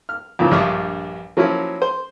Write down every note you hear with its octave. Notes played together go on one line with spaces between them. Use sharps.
F6
F2 A#2 C#3 E3
A#1 G2 D4 F4 C#6 D#6
F3 F#3 A#3 C#4 E4 F4
C5